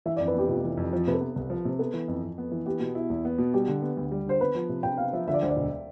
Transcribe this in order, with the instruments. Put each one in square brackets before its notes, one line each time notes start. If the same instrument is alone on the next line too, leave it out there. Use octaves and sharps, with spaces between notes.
[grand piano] E3 [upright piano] E5
[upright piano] D5
[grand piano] F2
[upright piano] B4
[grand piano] B3 [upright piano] G4
[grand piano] F1 [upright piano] F4
[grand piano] E3
F2
F3
[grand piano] C3 [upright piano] B4
[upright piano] A4
[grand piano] B3
C2
F3
C3
[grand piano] B3 [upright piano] A4
[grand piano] E3
F2
F2
B3
E3
[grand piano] B3 [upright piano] G4
[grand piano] B2
E4
E2
B3
B2
[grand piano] G3 [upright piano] G4
[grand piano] D3
B3
D2
G3
[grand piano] D3 [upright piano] C5
[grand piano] B3 [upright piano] B4
[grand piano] F3
C3
[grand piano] C3 [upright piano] G5
[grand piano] B3 [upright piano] F5
[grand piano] F3 [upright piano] E5
[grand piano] D3 [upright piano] E5
[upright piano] D5
[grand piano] D2 [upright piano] C5
[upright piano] D5
[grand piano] E1